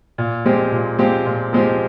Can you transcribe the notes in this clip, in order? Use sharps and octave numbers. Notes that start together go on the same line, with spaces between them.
A#2
F3 G#3 C4 G4
A#2
F3 G#3 C4 G4
A#2
F3 G#3 C4 G4